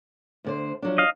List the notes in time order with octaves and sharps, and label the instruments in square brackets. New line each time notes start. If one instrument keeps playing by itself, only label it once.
[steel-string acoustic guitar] D2 D3 C5
F3 F#3 D4
[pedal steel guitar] D#5 F5